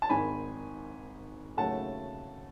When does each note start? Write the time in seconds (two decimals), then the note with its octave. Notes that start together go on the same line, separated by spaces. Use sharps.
0.02 A5
0.09 G#1 G#2 D#3 G#5 B5
1.57 D#2 C#3 F#3 A3 F#5 A5